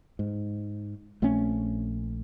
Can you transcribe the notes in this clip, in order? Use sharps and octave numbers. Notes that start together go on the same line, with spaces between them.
G#2
A#1 A3 C4 C#4